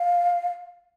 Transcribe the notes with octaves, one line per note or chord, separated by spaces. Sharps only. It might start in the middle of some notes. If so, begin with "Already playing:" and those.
Already playing: F5